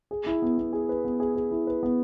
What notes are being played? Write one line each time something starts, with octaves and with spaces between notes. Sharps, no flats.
G#4
E4
B3
B3
G#4
B4
B3
G#4
G#4
E4
B4
B3